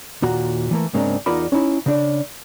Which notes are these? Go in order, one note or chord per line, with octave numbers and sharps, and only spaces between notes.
D#2 A#2 F#4 A#5
E3 A3 A#3
G#2 C#3 G#3 A#3 C4 D4
E2 D#4 F4 A#4 D5 B5
C#4 D#4 E4
C#3 D4 D5